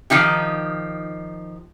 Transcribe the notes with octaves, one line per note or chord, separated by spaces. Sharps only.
D#3 F3 D#4 G4